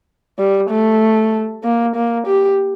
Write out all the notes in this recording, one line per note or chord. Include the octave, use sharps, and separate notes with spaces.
G3
A3
A#3
A#3
G4